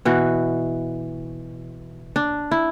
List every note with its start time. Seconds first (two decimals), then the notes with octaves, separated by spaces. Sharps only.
0.05 B2 E3 F#4
2.16 D4
2.51 E4